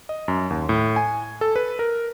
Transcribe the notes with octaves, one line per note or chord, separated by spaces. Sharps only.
D#5
F#2
D#2
A2
G#5
A4
B4
A#4